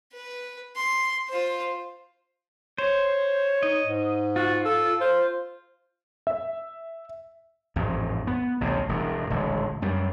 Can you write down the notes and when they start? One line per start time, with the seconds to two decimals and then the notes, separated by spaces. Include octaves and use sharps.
0.13 B4
0.77 C6
1.29 F4 C5
2.78 C5 C#5
3.63 D#4 D#5
3.84 G#2
4.36 F4 F#4
4.65 A4
5.01 F4 C5
6.27 E5
7.76 A1 F2 G#2
8.27 B3
8.61 A1 D2 C3
8.89 E1 E2 G2
9.30 D#1 A1 D3 G#3
9.82 F#2 G3